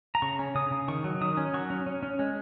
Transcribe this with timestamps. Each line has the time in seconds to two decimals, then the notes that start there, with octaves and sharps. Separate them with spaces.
0.15 A#5
0.22 C#3 C#6
0.39 C#4
0.55 C#3 D#6
0.71 C#3
0.88 D#3 C#6
1.04 F#3
1.21 D#3 D#6
1.37 C#4
1.54 F#3 C#6
1.70 C#4
1.86 C#4
2.03 C#4
2.19 G#3